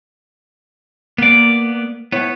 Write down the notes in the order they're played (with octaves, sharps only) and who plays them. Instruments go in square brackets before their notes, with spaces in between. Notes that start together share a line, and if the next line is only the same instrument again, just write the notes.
[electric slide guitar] A#3 [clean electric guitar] B3 D5
[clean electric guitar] B3 [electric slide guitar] E4 C#5